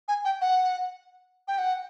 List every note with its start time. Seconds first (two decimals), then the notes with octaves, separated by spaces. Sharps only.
0.08 G#5
0.25 G5
0.41 F#5
1.48 G5
1.58 F#5